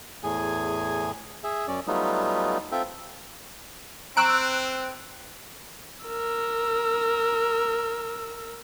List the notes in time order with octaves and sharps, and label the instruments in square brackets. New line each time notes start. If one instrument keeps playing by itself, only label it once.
[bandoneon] E2 A2 G#4 G#5
G#4 E5
F#2 C#4 D5
F#3 G3 A3 B3 D#4 F4
C4 F4 A4 E5 G5
[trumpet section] C4 [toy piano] A#5 C#6 [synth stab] E6 F#6 D7
[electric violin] A#4 E6